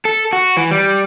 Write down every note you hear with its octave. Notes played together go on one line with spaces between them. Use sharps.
A4
F#4
E3
G3